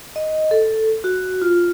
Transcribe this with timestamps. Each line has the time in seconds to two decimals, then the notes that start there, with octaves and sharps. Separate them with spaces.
0.16 D#5
0.51 A4
1.04 F#4
1.42 F4